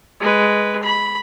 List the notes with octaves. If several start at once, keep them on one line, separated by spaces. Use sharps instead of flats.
G#3 B4
B5